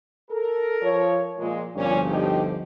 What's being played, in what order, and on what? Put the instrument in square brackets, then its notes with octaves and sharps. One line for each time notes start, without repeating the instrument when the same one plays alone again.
[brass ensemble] A4 A#4
[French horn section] F3 C#5
[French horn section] A#2 [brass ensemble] F3 G#3 A#3
[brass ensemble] G1 D2 F3 [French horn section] A#2 G3 C#4
[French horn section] D#4 G4